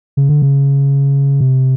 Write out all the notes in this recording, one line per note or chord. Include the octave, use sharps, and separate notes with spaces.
C#3
D3
C#3
C3